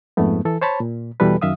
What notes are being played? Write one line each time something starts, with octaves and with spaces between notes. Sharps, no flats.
F2 G#2 A3 B3
E3 A4
C5 C#5 A5 B5
A#2
E2 B2 E3 G3 A4 B4
F#2 D#3 E5 F5 D#6